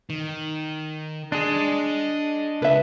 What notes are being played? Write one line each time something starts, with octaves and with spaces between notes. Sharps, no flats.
D#3
D4 G#4 D#5 C6
C#2 B4 E5